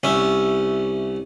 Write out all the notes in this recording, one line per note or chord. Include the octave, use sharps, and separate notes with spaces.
C2 C#4 E5